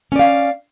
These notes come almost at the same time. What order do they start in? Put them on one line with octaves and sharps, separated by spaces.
C#4 D5 F5